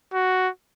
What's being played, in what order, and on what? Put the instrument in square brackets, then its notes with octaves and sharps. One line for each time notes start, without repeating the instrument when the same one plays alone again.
[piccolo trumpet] F#4